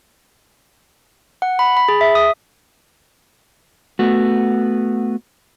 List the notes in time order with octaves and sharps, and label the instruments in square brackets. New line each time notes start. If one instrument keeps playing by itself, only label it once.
[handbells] F#5
B5
B5
G#4
E5
D#6
[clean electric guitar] A3 B3 F#4